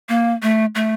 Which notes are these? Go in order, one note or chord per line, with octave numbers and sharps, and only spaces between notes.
A#3
A3
A3